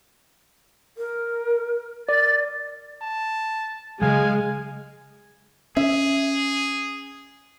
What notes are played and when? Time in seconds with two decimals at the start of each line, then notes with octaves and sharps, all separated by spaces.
0.98 A#4
2.09 A#4 D5 A6
3.02 A5
4.01 C#3 F#3 G#3 F5 G#5
5.77 C#4 G#4 E5